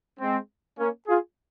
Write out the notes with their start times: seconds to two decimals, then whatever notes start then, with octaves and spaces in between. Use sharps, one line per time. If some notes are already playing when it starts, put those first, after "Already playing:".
0.20 G#3 C4
0.79 A#3 C#4
1.08 F4 G#4